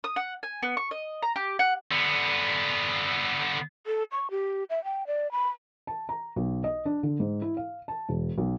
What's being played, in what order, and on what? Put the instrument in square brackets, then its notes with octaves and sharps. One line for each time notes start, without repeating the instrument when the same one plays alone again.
[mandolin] D#6
F#5
G#5
B3
C#6
D#5
A#5
G4
F#5
[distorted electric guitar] D3 B3
[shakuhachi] A4
C#6
G4
E5
G5
D5
B5
[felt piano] A5
A#5
B1
D#5
D4
D3
G#2
E4
F5
A5
E1
B1